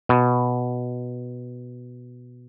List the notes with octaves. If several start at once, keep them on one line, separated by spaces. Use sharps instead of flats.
B2